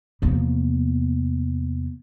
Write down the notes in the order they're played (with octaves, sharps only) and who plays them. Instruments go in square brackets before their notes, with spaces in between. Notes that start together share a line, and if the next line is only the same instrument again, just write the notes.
[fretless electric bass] E2 C3 F3 [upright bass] A#3 B3